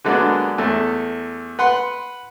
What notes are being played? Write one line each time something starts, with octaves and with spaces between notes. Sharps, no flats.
D3 F#3 G#3 A#3 B3 D4
E2 A3
B4 F#5 C6